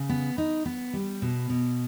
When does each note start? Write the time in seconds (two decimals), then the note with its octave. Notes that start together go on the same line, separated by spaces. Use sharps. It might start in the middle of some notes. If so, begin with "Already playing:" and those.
Already playing: C#3
0.09 B3
0.38 D#4
0.65 B3
0.93 G3
1.22 B2
1.50 B2